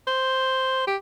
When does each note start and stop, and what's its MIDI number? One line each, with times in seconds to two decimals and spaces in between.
0.07 0.85 72
0.87 0.97 67